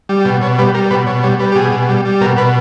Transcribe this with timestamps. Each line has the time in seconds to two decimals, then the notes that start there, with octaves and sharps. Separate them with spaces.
0.09 G3
0.25 B2
0.41 B2 C#5
0.58 G3 B4
0.74 G3 A#4
0.91 B2 B4
1.06 B2 C#5
1.23 G3 C#5
1.39 G3 B4
1.52 G4
1.55 B2 G#4
1.71 B2
1.89 G3
2.05 G3
2.21 B2 A#4
2.37 B2 B4